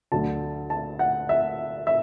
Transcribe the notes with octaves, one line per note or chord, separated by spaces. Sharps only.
D2 D3 F#3 A5
A5
F#5
E5
E5